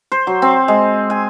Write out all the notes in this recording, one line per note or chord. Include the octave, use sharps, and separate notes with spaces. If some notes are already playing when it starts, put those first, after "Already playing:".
C5
F#3
C4
G#3
G#5